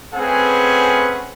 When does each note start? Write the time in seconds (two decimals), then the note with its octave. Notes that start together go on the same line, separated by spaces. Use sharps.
0.14 A3 C4 C#4 G#4 B4 F#5